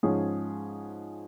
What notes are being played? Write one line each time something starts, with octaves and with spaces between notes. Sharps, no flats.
G#2 F3 C#4 G#4